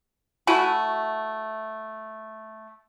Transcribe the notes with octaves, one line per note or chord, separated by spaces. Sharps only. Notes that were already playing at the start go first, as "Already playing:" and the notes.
A3 E4 F#4 G#5